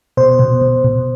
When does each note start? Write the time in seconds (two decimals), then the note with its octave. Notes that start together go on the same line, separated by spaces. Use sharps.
0.17 B2 C5
0.39 B2
0.61 B2
0.84 B2